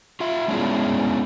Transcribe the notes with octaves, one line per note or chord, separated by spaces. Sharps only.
F4 E5
G#3 B3 C#4 D4 E4 G#4